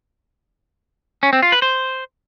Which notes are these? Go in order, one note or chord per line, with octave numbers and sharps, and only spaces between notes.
C#4
C4
F4
B4
C5